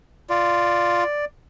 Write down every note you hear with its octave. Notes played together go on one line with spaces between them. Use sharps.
F4 D5